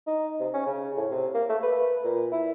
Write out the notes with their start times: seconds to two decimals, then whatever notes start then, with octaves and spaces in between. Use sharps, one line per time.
0.07 D#4
0.40 C3
0.54 C#4
0.66 C#3
0.97 A2
1.11 C3
1.34 A#3
1.50 A3
1.63 B4
2.04 A#2
2.32 E4